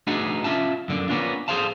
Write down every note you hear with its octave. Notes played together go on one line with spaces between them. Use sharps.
A3 B3 D4 D#4 F#4 G#4
C#4 F4 E5 A5
F#2 D3 A#3
A#3 B3 C#4 D4 F4
G#4 A4 C5 F5 A5